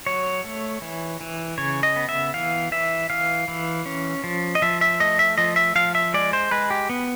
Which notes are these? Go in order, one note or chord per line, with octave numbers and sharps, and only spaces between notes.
F#3 C#5
A3
E3
E3
C#3 C#5
D#5
B3
E5
E3 F5
E3 E5
E3 F5
E3
C#4
F3
D#5
F3 E5
E5
A3 D#5
E5
F3 D#5
E5
F3 F5
E5
G#3 D5
C5
G#3 B4
G4
B3